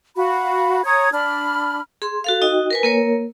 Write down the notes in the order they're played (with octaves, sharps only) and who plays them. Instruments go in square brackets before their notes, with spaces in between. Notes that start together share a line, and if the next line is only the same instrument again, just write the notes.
[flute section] F#4 F5 B5
C#5 A#5 D#6 G#6
D4 B5 F6
[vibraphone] G#4 C6
F#4 A4 F5
D#4 F#4 D#5 G5
A#4 B4 G#5
A#3 A#4 C#5